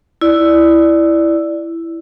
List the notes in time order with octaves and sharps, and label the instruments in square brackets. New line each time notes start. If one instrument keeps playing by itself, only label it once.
[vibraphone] E4 D5